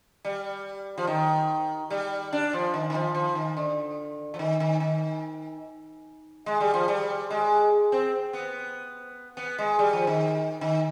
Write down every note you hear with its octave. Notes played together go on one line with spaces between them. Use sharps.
G3
F3
D#3
G3
D4
F3
D#3
D#3
F3
F3
D#3
D3
F3
D#3
D#3
D#3
G#3
G3
F3
G3
G#3
C4
B3
B3
G#3
G3
F3
D#3
D#3